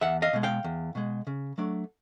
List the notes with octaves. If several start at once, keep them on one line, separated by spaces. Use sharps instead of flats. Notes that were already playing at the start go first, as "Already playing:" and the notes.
E2 E5 F#5
D#5 F5
B2 G#3
F5 G5
E2
B2 G#3
C#3
F#3 A3 D4